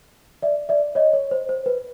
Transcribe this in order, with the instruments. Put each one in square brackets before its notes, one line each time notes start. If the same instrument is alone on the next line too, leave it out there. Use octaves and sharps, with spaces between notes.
[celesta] D5 E5
D5 E5
C#5 D#5
C#5
C5
C5
B4